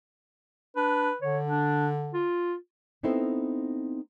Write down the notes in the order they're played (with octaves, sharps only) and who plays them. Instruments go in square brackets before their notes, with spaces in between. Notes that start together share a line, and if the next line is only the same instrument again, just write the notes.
[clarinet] D4 [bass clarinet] B4
[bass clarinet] D3 [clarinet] C#5
[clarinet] D4
F4
[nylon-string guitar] B3 C4 D#4 E4 A4 C5